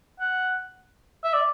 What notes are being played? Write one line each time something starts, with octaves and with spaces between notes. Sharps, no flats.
F#5
E5
D5